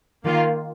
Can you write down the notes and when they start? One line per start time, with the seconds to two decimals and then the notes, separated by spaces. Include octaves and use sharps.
0.24 D#3 A#3 F4